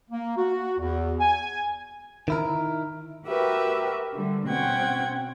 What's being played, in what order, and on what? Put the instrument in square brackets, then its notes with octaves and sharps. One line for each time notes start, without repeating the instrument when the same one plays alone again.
[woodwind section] A#3
F#4
E2
G#5
[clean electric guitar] D#3 E4 A#4
[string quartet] F#4 G4 A#4 B4 E5
D3 G3
B2 C4 C#4 F#5 G5 G#6